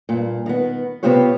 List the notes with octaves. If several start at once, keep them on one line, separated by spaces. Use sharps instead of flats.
G2 A#2
D#3 B3
C3 B3 C4 F4 G4 C#5